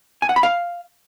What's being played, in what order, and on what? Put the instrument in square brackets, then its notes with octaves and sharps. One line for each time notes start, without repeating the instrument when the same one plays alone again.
[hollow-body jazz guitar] G#5
F#5
B5
F5